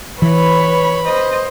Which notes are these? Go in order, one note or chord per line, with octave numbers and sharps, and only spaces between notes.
E3 B4 C#5 B5
C5 D#5